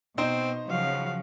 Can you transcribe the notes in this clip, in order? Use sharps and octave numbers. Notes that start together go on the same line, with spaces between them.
B2 C4 D#4 C5
C#3 F3 F#3 F#4 F5